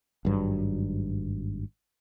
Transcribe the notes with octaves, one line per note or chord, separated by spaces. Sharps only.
G#1 G2 F#3